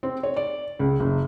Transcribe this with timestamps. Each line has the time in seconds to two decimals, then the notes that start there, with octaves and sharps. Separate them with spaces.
0.03 C4
0.23 C#5
0.36 D5
0.79 C#2
1.00 F#1